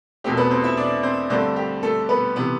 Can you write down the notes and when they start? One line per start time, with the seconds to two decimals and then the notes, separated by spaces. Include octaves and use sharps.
0.24 E2 B2 A3 C4 G4
0.37 B3 B4
0.51 C4 C5
0.64 E4 E5
0.77 D4 D5
1.03 C4 C5
1.30 G2 D3 A3 C4 C5
1.56 G4
1.83 A3 A4
2.09 B3 B4
2.36 C3 E3 B3